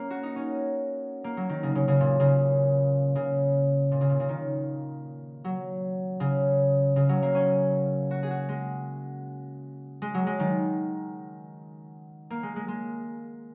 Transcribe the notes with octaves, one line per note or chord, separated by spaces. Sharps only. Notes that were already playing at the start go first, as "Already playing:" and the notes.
Already playing: A#3 C#4
F#4
D#4
C#4
A#3
F#3
D#3
C#3
C#3
C#3
A#2
C#3
C#3
A#2
C#3
A#2
C#3
D#3
F#3
C#3
C#3
F#3
A#3
C#4
F#4
G#4
F#4
G#3
G#3
F#3
G#3
D#3
A#3
G#3
G#3
G#3